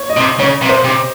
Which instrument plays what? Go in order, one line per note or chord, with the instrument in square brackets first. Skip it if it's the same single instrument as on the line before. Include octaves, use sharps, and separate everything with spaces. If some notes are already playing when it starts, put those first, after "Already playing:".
Already playing: [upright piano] C#5
D#5
[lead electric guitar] C3
[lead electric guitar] C#3 [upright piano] C#5
[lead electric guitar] C3
[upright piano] C5
[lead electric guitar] C3